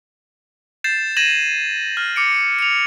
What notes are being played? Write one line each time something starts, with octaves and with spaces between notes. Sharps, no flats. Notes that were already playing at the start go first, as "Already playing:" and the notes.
G6 A6 C7 E7
G#6 A#6 D#7 E7 F#7
F6
D6 C#7 D7
C#7 F7